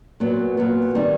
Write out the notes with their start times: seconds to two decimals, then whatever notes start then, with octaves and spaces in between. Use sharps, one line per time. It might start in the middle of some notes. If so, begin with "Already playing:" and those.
0.20 A#2 F#3 B3
0.57 A#2 F#3 B3
0.95 D#3 G3 C4 D#4